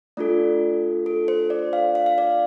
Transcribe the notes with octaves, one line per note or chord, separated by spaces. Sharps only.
A3 D4 F4 A4 D5
A4
C5
D5
F5
F5
F5
D5